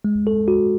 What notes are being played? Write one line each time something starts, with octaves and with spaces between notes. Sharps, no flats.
G#3
A4
F#4